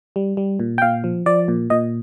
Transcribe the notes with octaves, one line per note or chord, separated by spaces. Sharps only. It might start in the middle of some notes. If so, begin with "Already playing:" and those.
G3
G3
A#2
G5
A#2 F5
F3
F3 D5
A#2
A#2 D#5